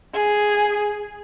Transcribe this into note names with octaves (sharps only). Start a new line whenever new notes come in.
G#4